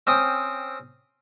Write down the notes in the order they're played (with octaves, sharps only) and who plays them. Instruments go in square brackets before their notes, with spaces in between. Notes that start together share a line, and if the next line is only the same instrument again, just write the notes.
[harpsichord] C4 C#4 G5 D#6